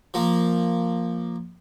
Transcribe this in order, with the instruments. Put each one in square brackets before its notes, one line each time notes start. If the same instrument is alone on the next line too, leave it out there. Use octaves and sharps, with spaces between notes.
[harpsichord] F3 A#3